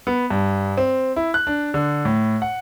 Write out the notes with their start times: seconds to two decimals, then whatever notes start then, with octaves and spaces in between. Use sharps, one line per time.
0.07 B3
0.30 G2
0.78 C4
1.16 E4
1.34 F#6
1.47 D4
1.74 D3
2.05 A2
2.42 F#5